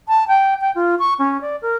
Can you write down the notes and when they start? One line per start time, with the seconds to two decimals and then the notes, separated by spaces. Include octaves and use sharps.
0.08 A5
0.28 G5
0.61 G5
0.75 F4
0.99 C#6
1.19 C#4
1.41 D5
1.62 A#4